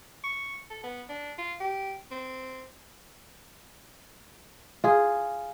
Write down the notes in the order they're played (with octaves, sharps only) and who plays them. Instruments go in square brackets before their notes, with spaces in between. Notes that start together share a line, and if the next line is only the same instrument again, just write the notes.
[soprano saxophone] C#6
A4
B3
D4
F4
G4
C4
[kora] F4 G#4